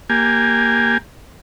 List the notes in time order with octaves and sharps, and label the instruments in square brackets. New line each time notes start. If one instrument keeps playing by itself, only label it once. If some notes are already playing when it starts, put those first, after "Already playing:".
[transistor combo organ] A#3 G4 G#5